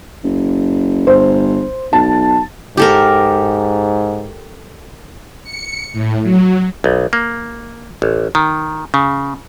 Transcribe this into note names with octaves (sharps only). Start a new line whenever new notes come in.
F#1
G1 C5
B1 A5
G#2 G4 A4 A#4
C#7
A2
F#3
B1
A#3
A1
D#3
C#3